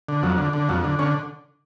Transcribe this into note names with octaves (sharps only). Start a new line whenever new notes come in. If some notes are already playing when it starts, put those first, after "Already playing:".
D3
F2 F#3
D3
D3
F2 F#3
D3
D3 C#4